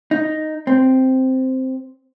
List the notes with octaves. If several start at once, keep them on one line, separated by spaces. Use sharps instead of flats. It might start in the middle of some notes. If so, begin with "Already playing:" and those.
D#4
C4